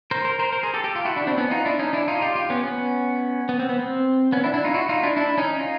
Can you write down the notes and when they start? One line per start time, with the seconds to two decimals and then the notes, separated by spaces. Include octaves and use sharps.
0.11 A#4 C5
0.24 A#4 C5
0.39 A#4 C5
0.52 A#4 C5
0.63 G#4 A#4
0.74 G4 A4
0.84 G4 A4
0.95 F4 G4
1.05 E4 F#4
1.16 D4 E4
1.27 C4 D4
1.37 B3 C#4
1.51 D#4 F4
1.65 D4 E4
1.79 C#4 D#4
1.93 D4 E4
2.08 D#4 F4
2.21 F4 G4
2.35 F4 G4
2.50 B3 C#4
2.64 B3 C#4
3.49 B3
3.59 C4
3.69 B3
3.80 C4
4.32 B3 C#4
4.44 D4 E4
4.54 D4 E4
4.64 D#4 F4
4.74 E4 F#4
4.89 D#4 F4
5.03 D4 E4
5.17 D4 E4
5.38 C#4 D#4
5.59 D#4 F4